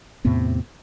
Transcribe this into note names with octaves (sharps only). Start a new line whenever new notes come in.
E2 A2 C3 B3